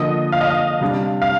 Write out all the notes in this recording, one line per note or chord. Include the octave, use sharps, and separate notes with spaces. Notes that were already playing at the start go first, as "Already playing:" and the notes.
Already playing: D3 F3 A#3 D#5
F5
D#5
F5
C3 G3 D4
F5